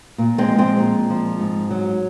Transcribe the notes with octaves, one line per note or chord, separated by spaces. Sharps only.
A#2
G#3 C4
F3
G#3 C4
A#2
F3
G#2
F#3